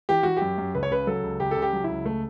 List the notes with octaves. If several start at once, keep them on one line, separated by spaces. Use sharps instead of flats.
E3 G4
E3 F#4
G4
F#2
F#2
C#2 B4
C#5
C#3 B4
F#3 A4
C#2
C#2 G4
A4
C#3
G4
F#3
E4
C#2
A3